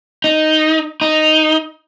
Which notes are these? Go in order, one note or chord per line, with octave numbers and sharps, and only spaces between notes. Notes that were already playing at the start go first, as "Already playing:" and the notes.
D#4
D#4